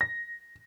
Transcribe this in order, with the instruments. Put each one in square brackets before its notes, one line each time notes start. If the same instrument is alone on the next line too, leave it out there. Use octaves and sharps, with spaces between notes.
[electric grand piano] A#6